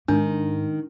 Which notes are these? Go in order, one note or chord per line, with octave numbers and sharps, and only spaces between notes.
G#2 D#3 D4